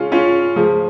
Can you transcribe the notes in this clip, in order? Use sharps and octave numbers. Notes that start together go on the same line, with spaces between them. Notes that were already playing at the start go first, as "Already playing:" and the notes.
Already playing: C#3 G#3 C#4 F4
C#4 F4
C#3 F3 G#3